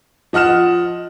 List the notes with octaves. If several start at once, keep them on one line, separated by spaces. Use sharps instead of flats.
F3 D#5 F#5 F6 E7